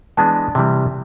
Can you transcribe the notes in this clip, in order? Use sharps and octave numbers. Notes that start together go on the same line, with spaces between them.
E3 G#3 B3 D4 A5
C3 E3 G3